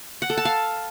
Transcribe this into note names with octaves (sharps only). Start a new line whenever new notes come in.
F#5
A4
A5
F5